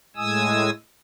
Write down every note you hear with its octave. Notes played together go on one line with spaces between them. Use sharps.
A2 G#3 G#5 D#6 E6